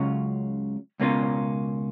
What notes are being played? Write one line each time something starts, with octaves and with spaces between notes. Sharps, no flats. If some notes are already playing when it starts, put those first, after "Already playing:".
Already playing: C#2 C#3 F#3 C#4 F4
C#2 B2 A#3 C#4 F4